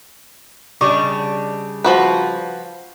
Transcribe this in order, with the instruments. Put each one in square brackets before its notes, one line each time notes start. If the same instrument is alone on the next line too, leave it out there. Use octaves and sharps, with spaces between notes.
[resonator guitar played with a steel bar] C#3 G3 D4 [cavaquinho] D#5 C#6 D6
[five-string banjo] F3 F#4 B4